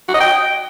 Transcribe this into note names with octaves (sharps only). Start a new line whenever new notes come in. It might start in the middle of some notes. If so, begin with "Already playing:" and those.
F#4
D#5
G5